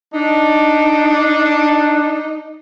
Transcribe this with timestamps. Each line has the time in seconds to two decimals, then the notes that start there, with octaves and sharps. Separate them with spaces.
0.13 D4 D#4